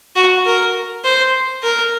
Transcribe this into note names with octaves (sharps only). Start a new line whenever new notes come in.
F#4
A#4
C5
A#4